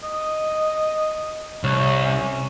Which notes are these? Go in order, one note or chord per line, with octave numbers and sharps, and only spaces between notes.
D#5
C2 C#5
C#4